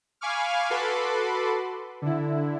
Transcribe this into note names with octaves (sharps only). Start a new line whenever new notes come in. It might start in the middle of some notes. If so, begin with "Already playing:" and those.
F5 G#5 B5 C#6 D6 F6
F#4 A4 B4 B5 C6 D6
D3 E4